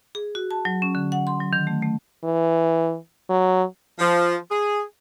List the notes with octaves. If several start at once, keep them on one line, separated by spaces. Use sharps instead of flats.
G#4
F#4
A5
F#3
C#4
D3
F#5
C6
F#3
D#3
A3
A3
E3
F#3
F3
G#4